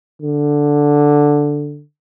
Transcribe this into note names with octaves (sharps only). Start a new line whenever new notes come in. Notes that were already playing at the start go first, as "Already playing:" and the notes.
D3